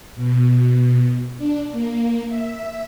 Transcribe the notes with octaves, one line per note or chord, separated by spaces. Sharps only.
B2
D4
A#3
E5